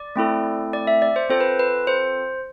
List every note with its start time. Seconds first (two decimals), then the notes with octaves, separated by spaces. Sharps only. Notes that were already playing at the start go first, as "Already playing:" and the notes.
Already playing: D5
0.16 A3 C4 E4 A4
0.73 D5
0.87 E5
1.02 D5
1.16 C5
1.30 C4 F4 A4 C5
1.40 B4
1.59 B4
1.87 C5